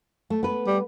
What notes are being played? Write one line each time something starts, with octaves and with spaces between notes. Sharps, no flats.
A3
B3 B4
G3